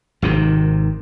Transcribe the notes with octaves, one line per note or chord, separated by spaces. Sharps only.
G#1 C3 D#3